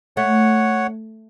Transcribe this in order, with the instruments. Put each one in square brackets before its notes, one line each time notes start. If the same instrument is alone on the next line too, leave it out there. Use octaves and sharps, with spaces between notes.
[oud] A3 [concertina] C#5 F#5